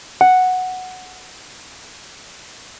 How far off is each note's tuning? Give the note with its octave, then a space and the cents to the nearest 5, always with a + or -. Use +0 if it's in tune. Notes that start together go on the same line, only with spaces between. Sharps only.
F#5 +0